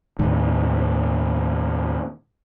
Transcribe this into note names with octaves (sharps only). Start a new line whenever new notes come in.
D#2 A2 D#3